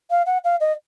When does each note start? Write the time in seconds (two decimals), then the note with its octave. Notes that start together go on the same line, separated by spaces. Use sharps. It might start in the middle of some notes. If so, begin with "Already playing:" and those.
0.11 F5
0.26 F#5
0.44 F5
0.60 D#5